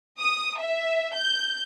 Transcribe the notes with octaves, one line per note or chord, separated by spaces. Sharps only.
D#6
E5
G6